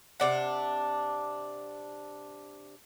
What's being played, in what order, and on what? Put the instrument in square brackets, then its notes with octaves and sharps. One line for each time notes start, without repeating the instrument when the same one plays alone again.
[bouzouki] C3 D4 F#5